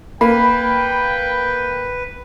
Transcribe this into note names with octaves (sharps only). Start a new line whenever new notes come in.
A#3 B4 G5 B5